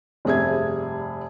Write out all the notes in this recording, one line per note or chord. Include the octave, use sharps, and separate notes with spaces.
F1 G2 G#4 E5 G#6